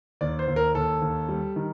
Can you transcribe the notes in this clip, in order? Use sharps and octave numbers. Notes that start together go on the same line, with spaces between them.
D#2 D5
C5
D#2
A#4
D#2 A4
D#2
G3
D#3